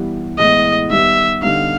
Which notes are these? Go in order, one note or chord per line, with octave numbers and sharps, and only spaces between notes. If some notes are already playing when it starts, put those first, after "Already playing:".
Already playing: E3 G3 B3
A2 E3 G#3 B3 D#5
D#3 G3 B3 E5
D3 G3 B3 D#4 F5